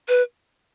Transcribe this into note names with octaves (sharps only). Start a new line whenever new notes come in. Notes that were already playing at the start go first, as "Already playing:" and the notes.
B4